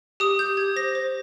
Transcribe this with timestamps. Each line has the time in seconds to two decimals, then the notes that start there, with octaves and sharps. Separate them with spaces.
0.20 G4 D#6
0.39 G4 G6
0.57 G4 G#6
0.76 C5 A#6
0.95 C5